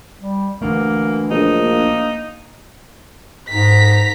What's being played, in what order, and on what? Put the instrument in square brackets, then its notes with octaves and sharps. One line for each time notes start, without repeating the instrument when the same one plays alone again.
[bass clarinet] G3
[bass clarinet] E3 [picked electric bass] A3 D4 [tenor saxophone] A#3
[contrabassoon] A#1 [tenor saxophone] D#4
[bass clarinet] A#3
[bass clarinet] G#2 [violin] A#5 B6